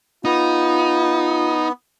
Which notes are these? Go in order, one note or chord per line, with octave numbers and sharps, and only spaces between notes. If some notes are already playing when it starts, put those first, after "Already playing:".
B3 D#4 F4